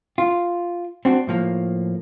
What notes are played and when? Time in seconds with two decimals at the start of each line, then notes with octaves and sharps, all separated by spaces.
0.18 F4
1.05 C4 D4 F#4
1.27 A2 F3 A#3